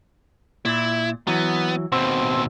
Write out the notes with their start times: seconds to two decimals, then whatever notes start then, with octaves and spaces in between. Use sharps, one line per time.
0.65 A#2 E4
1.27 E3 F#3 B3
1.92 D#2 B2 C4